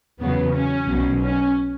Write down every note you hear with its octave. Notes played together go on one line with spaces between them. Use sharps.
E2 C#3 F#3 B3
C#4
B1 B2 F#3
C#4